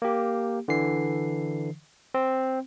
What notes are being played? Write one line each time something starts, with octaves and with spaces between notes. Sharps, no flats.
A#3 G4
D3 E3 C7
C4